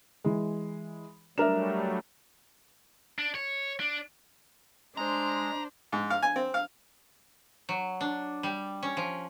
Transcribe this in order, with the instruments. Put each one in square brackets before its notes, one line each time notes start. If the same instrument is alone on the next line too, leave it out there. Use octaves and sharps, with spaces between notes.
[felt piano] E3 G#3
[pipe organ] F#3 G3 A3 [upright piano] D4 A#4 [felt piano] E5 E7
[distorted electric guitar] D4
C#5
D4
[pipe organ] G#3 [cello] D4 [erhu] C5 [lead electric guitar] A#5
[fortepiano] G#2
F5
G#5
C4
F5
[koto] F#3
D4
G3
C#4
F3